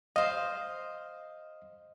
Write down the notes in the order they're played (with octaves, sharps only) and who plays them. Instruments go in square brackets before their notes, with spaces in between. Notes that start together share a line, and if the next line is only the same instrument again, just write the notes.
[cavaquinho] C5 F5 [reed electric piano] D#5